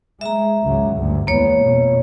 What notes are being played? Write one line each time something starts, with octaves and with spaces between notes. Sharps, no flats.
G#3 E5 A#5
G#1 C#2 F#3
D2 G2
G#1 E2 A#3 B3 C#5
F2 B2